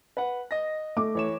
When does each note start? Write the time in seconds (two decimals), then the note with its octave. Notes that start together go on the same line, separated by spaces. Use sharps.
0.17 B4 F#5
0.51 D#5 A#6
0.97 A3 D6
1.15 E3 C#5 E7